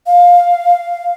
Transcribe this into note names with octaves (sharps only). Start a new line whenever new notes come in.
F5